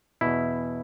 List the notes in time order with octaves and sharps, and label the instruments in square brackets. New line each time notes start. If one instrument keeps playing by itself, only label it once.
[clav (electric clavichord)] E2 B2 E4